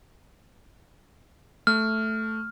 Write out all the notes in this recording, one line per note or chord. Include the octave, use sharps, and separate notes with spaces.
A3 F6